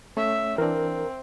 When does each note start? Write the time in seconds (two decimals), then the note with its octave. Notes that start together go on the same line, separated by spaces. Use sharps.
0.17 A3 C#4 C#5 E5
0.58 E3 C4 D4 A#4